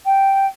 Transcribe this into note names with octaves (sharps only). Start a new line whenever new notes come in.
G5